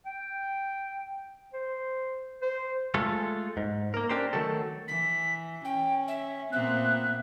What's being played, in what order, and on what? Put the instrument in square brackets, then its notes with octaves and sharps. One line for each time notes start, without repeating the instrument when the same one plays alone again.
[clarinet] G5
C5
C5
[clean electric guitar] G#3 A3 F4 A4
G#2
A#3 A#4
C#4 D4 G4 A#4 C5
D#3 F#3 A3 A4
[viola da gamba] E3 [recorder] B6
[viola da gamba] C#4 [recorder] G5
[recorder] E5
[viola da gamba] A#2 B3 C4 [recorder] E5 [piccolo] F#6